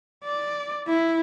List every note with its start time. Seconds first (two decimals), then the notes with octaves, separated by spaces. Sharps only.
0.24 D5
0.87 E4